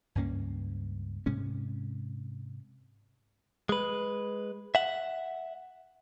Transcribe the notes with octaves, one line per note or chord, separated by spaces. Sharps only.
C#2 G2 A#3 C#4
G#2 C3 G#3 C#4
G#3 B4
E5 F#5